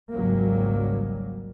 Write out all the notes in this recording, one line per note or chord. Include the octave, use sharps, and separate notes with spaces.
G#1 C#2 C#3 F#3 G3 A#3